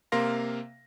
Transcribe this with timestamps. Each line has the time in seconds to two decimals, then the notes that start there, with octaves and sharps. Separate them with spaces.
0.12 C3 A#3 A#4 F5 C6 A#6